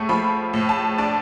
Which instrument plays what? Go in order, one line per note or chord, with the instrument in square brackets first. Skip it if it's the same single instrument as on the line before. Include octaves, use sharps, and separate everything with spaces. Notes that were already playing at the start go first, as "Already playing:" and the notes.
Already playing: [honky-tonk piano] A2 A3 C#6
F3 B5
A2
A5
D4 A5